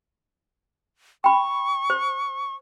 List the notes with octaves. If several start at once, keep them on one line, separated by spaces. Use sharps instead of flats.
G5 B5 C#6
C5